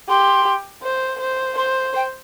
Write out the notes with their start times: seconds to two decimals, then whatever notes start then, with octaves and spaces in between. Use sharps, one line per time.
0.09 G4 C6
0.83 C5
1.20 C5
1.57 C5 C6
1.96 G5